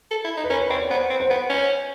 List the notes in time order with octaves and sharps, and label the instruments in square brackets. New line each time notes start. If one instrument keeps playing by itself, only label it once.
[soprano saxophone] A4
E4
D#4
[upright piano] B4
[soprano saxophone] C#4 [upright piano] A#4
[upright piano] B4
[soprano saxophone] C4 [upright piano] C#5
[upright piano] D5
[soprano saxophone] B3 [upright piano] C5
[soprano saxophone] C4
[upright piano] C5
[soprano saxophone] B3 [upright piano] B4
[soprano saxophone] C#4